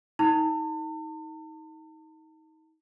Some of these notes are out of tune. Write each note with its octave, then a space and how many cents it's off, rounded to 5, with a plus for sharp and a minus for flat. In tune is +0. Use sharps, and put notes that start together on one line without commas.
D#4 +30 A5 +40